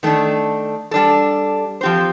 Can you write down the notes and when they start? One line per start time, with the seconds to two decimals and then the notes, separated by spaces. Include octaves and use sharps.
0.03 D#3 A3 D4
0.91 G3 D4 A4
1.81 F3 C4 G4 C5